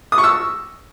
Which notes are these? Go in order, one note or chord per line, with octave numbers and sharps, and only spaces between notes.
D#6
C#6
E6